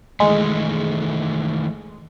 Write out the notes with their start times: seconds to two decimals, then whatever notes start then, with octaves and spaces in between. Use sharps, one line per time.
0.20 D#3 E3 G#3 A3